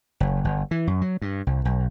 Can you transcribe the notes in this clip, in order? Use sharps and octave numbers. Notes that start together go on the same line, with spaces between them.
F#1
G1
E3
F#2
F#3
G2
C2
B1